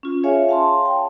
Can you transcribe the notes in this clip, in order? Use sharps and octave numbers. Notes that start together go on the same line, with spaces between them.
C#4 F4
G#4 C#5 E5 F5 G#5
F5 A5 C6
G5